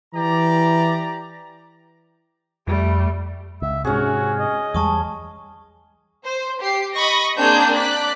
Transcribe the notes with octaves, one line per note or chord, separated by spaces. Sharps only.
E3 G4 D5 A#5
F2 G3 A3
C#2 E5
G#2 C3 C#4 F#4 G#4
D#5
E2 G3 G#3 A5 C#6 D#6
C5
G4 C7
D#5 B5 C#6 A#6
A#3 C4 D4 G#4 G#5 G6
D5 F#6 B6